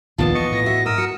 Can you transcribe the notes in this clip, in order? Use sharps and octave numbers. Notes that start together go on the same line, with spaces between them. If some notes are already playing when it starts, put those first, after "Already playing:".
A#1 D#2 A#2 D#3 B3 F4 A5
C#3 E3 D#5 C#6
A2 A#6
F#4 E5
G#2 A#4 D#6 E6
F#4 C#7